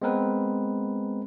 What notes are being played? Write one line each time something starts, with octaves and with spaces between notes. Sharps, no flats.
G#3 B3 C4 A#4 B4